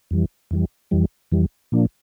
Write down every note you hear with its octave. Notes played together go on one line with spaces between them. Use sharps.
F2 E3 G3
F2 E3 G3
F2 E3 G3
F2 E3 G3
A#2 F3 A#3 D4